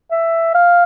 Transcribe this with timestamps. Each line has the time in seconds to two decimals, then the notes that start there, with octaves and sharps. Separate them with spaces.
0.11 E5
0.54 F5